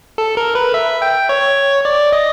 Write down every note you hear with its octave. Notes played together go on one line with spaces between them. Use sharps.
A4
A#4
B4
E5
G5
C#5
D5
D#5